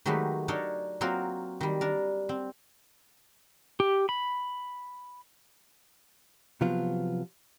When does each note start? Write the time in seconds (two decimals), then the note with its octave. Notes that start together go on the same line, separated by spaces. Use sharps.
0.06 D#3 F#3 G#3 A3 G4 B4
0.48 D4 D#4 A4 A#4 C#5 D#5
1.01 F#3 A#3 C4 F4 F#4 A#4
1.61 D#3 G3
1.81 D4 A#4
2.29 C4
3.80 G4
4.09 B5
6.61 C3 F3 F#3 B3 F4